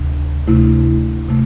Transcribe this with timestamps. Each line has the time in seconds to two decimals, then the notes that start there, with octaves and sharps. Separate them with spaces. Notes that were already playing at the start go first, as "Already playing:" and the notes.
Already playing: D2 C3
0.47 D2 C3 A3 E4
1.29 C3 A3